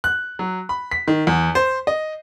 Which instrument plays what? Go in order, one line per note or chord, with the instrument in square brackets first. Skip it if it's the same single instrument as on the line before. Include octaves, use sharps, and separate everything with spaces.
[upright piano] F#6
F#3
B5
B6
D#3
E2
C5
D#5